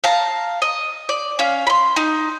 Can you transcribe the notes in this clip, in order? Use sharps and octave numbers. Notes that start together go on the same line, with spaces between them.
F5 A5 A#5
D#5
D5
C#4 F5
B5 C6
D#4